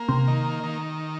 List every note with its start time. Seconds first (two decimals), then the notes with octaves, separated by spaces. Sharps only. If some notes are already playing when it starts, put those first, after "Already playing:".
Already playing: A#3
0.09 C3 C4
0.28 D#3
0.64 D#3